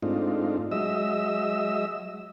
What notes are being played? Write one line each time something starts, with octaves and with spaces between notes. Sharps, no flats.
G#2 A3 C4 D4 D#4 F4
F#3 G#3 D#5 E5 E6